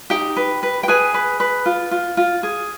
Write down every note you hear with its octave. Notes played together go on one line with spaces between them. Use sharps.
D#4 G4 G5
B4
B4
G5
G#4 B4 G#5
B4
B4
F4
F4
F4
G#4